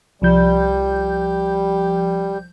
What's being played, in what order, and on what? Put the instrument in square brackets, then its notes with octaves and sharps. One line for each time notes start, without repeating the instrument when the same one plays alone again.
[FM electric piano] C2 F3 G6 [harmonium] G3